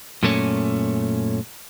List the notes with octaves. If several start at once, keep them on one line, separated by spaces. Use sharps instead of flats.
F#2 A#2 A3 C#4